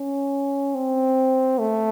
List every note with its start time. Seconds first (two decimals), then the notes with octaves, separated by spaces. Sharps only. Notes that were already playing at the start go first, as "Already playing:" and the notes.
Already playing: C#4
0.75 C4
1.59 A3